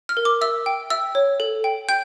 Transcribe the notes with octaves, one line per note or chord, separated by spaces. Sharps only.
F6
A#4
D6
E5 E6
G5
E5 E6
C#5
A4
G5
G5 G6